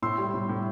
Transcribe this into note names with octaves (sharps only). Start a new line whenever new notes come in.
A2 C6 E6
G3
A2
A2